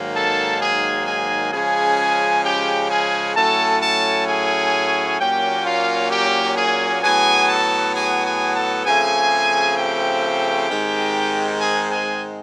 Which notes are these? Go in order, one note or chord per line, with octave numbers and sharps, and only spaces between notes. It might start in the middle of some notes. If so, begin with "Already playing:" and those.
Already playing: G#2 D#3 F#3 A#3
A4 A5
G#4 G#5
G#4 G#5
C#3 F3 G#3 C#4 G#4 G#5
G4 G5
G#4 G#5
A2 F#3 A3 C#4 A4 A5
A4 A5
G#4 G#5
A#2 F#3 A#3 C#4 G4 G5
F4 F5
G4 G5
G#4 G#5
A2 F#3 B3 G#4 G#5
A4 A5
G#4 G#5
G#4 G#5
A4 A5
C#3 F3 A3 C4 G#4 G#5
G4 G5
G#2 D#3 G#3 C4
G#4 G#5
G#4 G#5